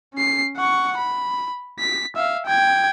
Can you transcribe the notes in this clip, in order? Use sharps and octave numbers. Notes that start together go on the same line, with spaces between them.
C#4 C7
F#5 C#6
B5
B6
E5 F5
G5 G#6